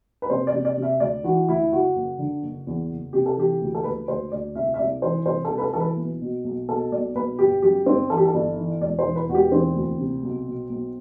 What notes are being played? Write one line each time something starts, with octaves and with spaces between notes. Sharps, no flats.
B4
C3 C5
D5
C3
D5
C3
E5
D2 D5
E3 F#4
D2 E4
F#1 F#4
F#1
D3
F#1
E2
F#1
C3 G4
A4
E3 G4
D2
A4
D2 B4
D2 C5
D2 D5
C2 E5
E5
C2 D5
E3 C5
C2 C5
A4
C2
B4
A4
E3 A4
B4
B1
B2
B1
B2 A4
B1 D5
B1 B4
G1 G4
F#2 G4
G1 C4
E3 A4
G4
A4
G1
E3
E1 D5
C5
E3
B4
E1 F#4
G4
E3 C4
D2
C3
B1
B2
B1